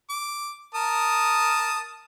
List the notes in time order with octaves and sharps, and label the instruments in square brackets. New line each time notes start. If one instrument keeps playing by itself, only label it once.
[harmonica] D6
A#4 A5 D#6